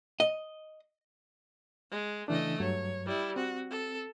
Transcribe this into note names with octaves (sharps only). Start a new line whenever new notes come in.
D#5
G#3
C#3 E3 A3 D4 D#5
G2 F#3 C#5
G3 E4
C4 F#4
A4